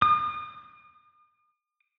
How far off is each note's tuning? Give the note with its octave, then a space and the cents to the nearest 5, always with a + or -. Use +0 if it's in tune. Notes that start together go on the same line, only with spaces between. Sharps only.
D#6 -45